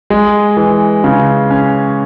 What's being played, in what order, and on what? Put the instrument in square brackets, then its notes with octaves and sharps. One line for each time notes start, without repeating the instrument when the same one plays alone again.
[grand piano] G#3
E3
C#3
C#4